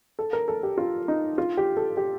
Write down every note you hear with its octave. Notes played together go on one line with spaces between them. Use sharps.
A4
A#4
A4
G4
F4
D#4
F4
G4
A4
G4